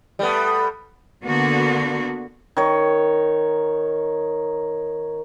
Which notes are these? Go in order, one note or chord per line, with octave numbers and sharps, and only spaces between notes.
G3 A3 B3
D3 A#3 B3 F#4
D#3 C#5